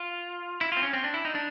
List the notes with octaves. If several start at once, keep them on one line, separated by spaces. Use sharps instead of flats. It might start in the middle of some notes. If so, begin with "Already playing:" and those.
Already playing: F4
E4
C4 F4
C#4
C4
D4
E4
D#4
D4